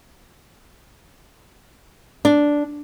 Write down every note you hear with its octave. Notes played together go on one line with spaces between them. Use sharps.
D4